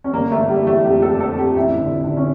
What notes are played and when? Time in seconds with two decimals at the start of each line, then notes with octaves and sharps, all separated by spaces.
0.04 C#4
0.13 G1 A#3
0.31 A3
0.37 G1
0.49 G3
0.61 E3
0.67 A3
0.84 F2 G4
1.02 A4
1.08 G1
1.20 A4
1.32 F2
1.38 G4
1.56 A1 E4
1.80 D3
2.04 D3
2.17 C#4